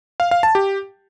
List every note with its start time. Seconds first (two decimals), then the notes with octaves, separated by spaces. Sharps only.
0.20 F5
0.31 F5
0.43 A5
0.55 G4